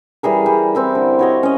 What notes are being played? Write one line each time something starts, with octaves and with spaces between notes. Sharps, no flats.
E3 G3 G#4 A#4
G3
C4 E4 A#4
D3
F#4 C#5 D#5
C#4 D#5